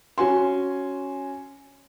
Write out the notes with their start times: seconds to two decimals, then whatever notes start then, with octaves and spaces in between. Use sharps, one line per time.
0.18 C#4 F#4 G#5 C6